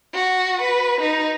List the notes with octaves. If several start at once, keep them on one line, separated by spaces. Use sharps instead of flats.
F#4
B4
D#4